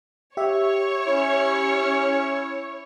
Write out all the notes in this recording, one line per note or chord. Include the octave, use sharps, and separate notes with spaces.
G4 C#5 E5
C#4 E4